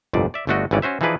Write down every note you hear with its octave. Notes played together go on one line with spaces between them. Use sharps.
G1 C2 F2 A#2 D5
D5 E5
G1 D3 A3 D4 F#4 D#5
G#1 G2 E3 C#4 D5
C#4 F#4 C5 E5
E3 F3 D#4 G#4 B4 D5